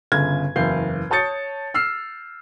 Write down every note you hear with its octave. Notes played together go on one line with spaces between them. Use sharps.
G1 C#3 G#6
F#1 E2 F5 G6 C7
C#5 A5 D#6 G6 A6 C#7
E6 F6 C7